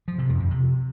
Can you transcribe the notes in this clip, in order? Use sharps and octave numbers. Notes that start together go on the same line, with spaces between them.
F3
C3
F2
F2
C3